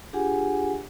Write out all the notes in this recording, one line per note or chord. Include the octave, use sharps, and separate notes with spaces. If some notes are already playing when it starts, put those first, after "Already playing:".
D4 F4 G4 G#4 F#5 G#5